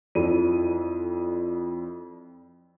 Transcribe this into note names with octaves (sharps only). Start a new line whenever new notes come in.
F2 F3 E4 A4 D5 D#7